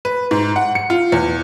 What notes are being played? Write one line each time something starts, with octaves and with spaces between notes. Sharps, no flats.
B4
G#2
F#5
C#7
F4
E2